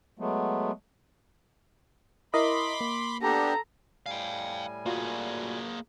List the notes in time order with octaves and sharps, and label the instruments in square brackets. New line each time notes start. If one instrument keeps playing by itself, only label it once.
[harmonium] F#3 G#3 A3 B3
[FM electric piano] E4 A#4 D#5 [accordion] B5 C6 D6
[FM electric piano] A#3
[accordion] B3 D4 G4 [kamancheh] A4 A#5
[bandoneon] A2 G3 G#5 [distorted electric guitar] F5 G5
[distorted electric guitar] A#3 G#4 [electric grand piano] F4 F#4 D5